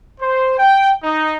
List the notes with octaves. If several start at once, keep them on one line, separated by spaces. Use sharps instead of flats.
C5
G5
D#4